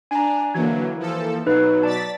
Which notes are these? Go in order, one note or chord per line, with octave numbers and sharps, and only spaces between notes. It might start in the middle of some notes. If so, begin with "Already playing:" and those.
D4 G#5 A#5
D3 E3 F#3 A#3 G#6
F3 A4
B2 F#3 D#4 B4
D5 A5 A6 B6